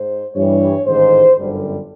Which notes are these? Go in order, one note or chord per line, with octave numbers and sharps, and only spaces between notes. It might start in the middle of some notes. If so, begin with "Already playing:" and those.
Already playing: G#2 C5
G2 E3 G3 C#5
A1 G#2 D#3 C5
G1 F#2 D3 G3